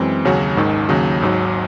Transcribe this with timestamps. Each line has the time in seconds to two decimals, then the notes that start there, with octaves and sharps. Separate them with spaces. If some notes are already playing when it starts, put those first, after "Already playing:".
Already playing: F#2 E3 G#3 C4
0.25 D#2 C#3 F#3 C#4 F#4
0.57 G#1 G#2 D#3
0.89 D#2 C#3 F#3
1.22 G#1 G#2 F#3